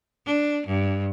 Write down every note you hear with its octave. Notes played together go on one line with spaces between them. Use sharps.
D4
G2